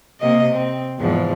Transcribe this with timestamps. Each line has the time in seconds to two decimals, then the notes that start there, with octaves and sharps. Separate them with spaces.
0.21 C3 A#3 D#5
0.53 C4
0.99 E2 G#2 F3